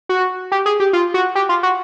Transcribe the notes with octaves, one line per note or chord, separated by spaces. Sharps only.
F#4
G4
G#4
G4
F4
F#4
G4
F4
F#4